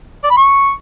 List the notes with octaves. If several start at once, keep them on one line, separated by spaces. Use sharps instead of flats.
D5
B5
C#6